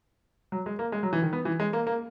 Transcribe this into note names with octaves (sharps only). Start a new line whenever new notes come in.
F#3
G#3
A#3
G#3
F#3
E3
D#3
B3
E3
G#3
A#3
A#3